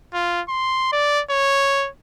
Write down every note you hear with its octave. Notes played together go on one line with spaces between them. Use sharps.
F4
C6
D5
C#5